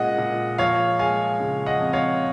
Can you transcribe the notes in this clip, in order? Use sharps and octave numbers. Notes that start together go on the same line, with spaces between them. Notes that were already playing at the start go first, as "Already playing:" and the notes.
Already playing: A#2 G#3 C#4 D#5 F#5
A#2
F3 C#5 F5
G#3 F5 G#5
C#3
D#5 F#5
F2
C#5 F5